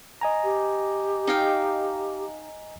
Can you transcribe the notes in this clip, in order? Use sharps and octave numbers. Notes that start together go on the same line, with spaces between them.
D#5 G#5 A#5
G4
D#4 F5 G5